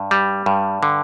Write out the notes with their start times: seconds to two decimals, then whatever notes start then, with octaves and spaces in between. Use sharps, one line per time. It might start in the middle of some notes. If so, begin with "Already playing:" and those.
Already playing: G2
0.11 G3
0.46 G2
0.83 D3